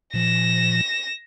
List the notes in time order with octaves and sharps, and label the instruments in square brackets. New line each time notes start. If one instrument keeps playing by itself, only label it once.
[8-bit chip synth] A#2 F3 [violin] A#6 E7